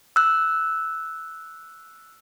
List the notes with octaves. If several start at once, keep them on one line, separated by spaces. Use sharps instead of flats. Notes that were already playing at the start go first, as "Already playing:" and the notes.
E6 F#6